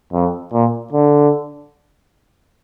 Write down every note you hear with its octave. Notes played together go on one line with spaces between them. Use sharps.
F2
A#2
D3